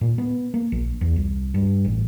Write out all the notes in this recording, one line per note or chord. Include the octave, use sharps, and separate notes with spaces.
A#2
B3
A#3
A#1
E2
C2
G2
A1